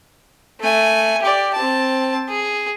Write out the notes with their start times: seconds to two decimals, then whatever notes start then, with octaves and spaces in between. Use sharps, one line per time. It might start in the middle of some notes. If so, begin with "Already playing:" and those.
0.60 A3 G#5
1.22 G4 D5
1.54 C4 A5
2.29 G#4